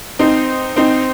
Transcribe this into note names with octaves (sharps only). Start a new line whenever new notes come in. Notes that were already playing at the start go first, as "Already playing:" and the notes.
C4 D#4
C4 D#4